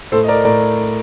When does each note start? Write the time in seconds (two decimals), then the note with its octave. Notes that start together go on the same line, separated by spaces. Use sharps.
0.12 A2 A4 C5
0.24 D#5
0.28 A#4 D5
0.45 A2 A#4 D5